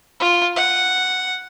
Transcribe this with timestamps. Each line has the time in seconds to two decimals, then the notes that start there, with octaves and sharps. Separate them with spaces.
0.20 F4
0.56 F#5